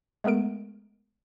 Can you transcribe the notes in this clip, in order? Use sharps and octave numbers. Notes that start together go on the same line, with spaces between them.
G#3 A3 B3 A#4 D7